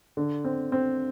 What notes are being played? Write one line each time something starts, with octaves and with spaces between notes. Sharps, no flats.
D3
C4
C4